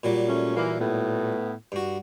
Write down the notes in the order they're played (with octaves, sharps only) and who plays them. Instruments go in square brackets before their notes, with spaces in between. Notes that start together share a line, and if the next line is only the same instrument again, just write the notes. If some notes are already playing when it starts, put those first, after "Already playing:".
[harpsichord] A#2 F#3 G3
[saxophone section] A3 C#4
E3 A#3
A2 B3
[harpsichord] G2 F#4